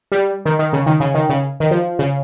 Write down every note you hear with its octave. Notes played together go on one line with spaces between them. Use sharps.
G3
D#3
D#3
C#3
D#3
C#3
D#3
C#3
D#3
F3
C#3